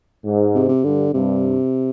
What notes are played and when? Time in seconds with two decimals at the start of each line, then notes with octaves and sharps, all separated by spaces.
0.25 G#2
0.55 C3
0.69 C3
0.84 G2 D3
1.14 G2 C3